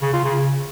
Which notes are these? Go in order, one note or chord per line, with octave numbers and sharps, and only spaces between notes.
C#3
F4
C#3